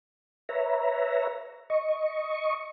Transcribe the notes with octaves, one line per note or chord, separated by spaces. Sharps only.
B4 C#5 E5 A#5
D#5 C#6